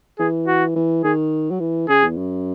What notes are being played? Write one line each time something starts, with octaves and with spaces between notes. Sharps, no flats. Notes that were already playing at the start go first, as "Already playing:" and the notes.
E3 G#4
F#4
E3
D#3 G#4
F#3
E3
C#3 G#4
E2
F#2